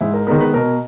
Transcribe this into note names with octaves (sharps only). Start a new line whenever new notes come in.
G#2 E4
A#4
D#3 G#3 B3 A#4
B4
B2 A#4